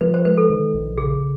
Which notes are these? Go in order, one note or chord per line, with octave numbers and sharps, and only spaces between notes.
F3 B4
C5
G#3 B4
A4
D#3
A#1
C#3 G#4